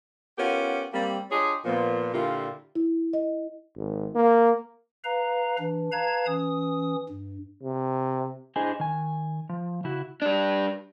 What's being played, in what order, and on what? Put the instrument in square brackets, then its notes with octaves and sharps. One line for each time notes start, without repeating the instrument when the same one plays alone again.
[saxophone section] B3 C#4 F4 G4 A#4 F#5
G3 A#3 C4
D4 F4 G4 G#4 C#5 D#5
A#2 F3 B3
A#2 D3 E4 F4 G4 A#4
[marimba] E4
D#5
[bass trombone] G#1
A#3
[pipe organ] B4 F5 A#5
E3 D4
B4 F5 A5 A#5 G#6
E3 C#4 D#6
G2
[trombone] C3
[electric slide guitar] D4 E4 G#4 C5 D#5 G#5
D#3 G#5
F3
C#3 E4 F#4
[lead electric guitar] G3 D4